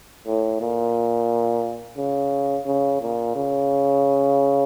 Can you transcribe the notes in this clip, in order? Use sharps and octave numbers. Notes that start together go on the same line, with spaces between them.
A2
A#2
C#3
C#3
A#2
C#3